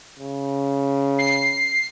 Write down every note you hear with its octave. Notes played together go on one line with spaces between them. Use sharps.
C#3
C7